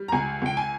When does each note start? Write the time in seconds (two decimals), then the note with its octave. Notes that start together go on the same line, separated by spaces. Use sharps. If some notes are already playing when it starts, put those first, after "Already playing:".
Already playing: G3
0.08 A#5
0.12 C#2 G#5
0.42 C#2 G5
0.57 G#5